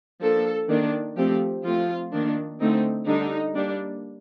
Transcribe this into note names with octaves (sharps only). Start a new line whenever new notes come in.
F3 A#3 D4 A4
D#3 A#3 D4
F3 A3 C4 G4
F3 A3 C4 F4
D#3 A#3 D4
D3 A3 C4 D#4
D3 G3 D4 D#4
G3 A#3 D4